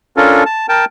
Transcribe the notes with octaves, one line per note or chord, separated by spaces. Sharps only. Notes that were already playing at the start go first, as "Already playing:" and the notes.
C#4 D4 F4 A4 A#4
A5
A#4 G5 A5